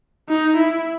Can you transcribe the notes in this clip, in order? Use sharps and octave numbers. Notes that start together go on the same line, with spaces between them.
D#4
E4